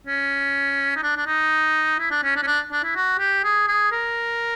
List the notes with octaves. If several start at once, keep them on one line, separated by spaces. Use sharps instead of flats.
C#4
D#4
D4
D4
D#4
E4
D4
C#4
D4
C#4
D4
D4
E4
F#4
G4
G#4
G#4
A#4